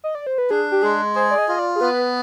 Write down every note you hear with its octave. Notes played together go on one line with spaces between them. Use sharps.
D#5
D5
C5
B4
D4 G#4
G4
G#3 G#4
G#4 C5
D5
D#5
F4 D#5
D5
G#4
B3 B4